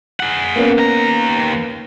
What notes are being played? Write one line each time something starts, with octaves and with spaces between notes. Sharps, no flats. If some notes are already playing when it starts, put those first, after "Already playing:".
G#4 F#5
A#3 B3 C#4
D#2 A#5